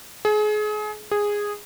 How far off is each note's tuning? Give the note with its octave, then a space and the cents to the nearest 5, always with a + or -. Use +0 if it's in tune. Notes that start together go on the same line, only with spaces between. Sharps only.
G#4 +30
G#4 -10